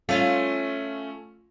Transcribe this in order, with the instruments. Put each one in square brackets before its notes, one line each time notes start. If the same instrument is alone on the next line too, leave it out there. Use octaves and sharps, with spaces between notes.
[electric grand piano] A3 C#4 [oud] F4